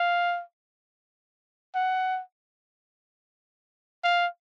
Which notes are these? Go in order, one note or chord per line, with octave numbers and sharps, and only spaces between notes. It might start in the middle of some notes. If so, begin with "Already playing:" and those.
Already playing: F5
F#5
F5